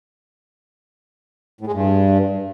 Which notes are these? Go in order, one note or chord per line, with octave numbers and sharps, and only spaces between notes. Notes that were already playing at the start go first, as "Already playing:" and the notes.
A2
G#3
G2